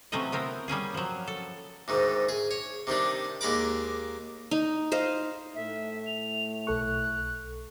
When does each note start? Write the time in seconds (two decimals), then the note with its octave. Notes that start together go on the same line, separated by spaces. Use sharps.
0.12 C3 E3 F#3 A3 C#4 D#5
0.32 B3 C4 A#4
0.68 G3 A#3 C#4 G#4
0.94 F3 F#3
1.27 A4
1.88 D2 G#2 D#3
2.29 G#4
2.51 C#5
2.87 C3 D#3 G3 D4
3.41 D#2 G#3 A#4 B5 D6
4.51 D#4
4.92 C5 D#5 F5
5.55 A2 A3 E5
6.06 F7
6.67 B1 A4 C#6 F#6